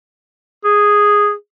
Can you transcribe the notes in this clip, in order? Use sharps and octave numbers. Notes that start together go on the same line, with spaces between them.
G#4